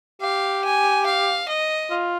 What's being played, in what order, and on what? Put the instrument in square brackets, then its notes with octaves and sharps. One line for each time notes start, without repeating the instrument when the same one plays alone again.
[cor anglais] G4 [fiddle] F5
[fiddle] G#5
F5
D#5
[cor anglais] F4